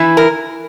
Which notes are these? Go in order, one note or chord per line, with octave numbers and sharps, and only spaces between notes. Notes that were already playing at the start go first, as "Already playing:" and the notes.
Already playing: E3 E4
A#4